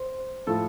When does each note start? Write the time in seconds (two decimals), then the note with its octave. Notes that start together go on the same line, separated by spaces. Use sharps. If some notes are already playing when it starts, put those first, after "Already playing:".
Already playing: C5
0.47 A2 F3 A4